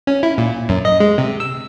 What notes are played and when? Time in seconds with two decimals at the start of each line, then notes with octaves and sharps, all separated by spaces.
0.07 C#4
0.23 E4
0.38 A#2
0.69 F#2
0.85 D#5
1.00 G#3
1.18 C3
1.40 E6